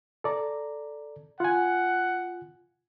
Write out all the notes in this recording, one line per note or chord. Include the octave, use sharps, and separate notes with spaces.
A4 D5 A#5
F4 F#5 G#5